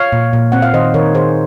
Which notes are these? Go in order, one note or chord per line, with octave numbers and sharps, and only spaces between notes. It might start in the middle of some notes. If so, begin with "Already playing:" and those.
Already playing: C#5 F5
A#2
A#2
C4 F#5
F5
D#3 C5 D#5
D#3 A#4 C#5
D#3 G#4 C5